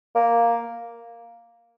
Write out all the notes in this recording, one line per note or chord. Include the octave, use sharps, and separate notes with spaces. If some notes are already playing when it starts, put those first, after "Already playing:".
A#3